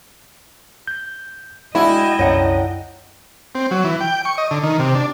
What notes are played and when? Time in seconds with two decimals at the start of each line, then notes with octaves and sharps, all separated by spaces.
0.88 G6
1.75 G#3 D4 E4 F#4 D#5 G5 B5
2.19 C2 F#2 D3 C#5 F#5 A#5
3.55 C4
3.71 F#3
3.84 E3
4.01 G5
4.25 C#6
4.38 D#5
4.51 D3
4.63 D#3
4.79 C3
4.95 D4